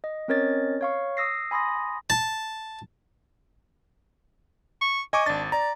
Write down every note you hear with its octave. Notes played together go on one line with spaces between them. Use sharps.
D#5
C4 C#4 A#4 C#5 D#5 A6
C#5 F5 C#6
D#6 E6 A#6 C7
G#5 B5 C6 D#6 A#6
A5
C#6
D#5 G#5 C#6 D6
G#1 D4 A6
D5 A#5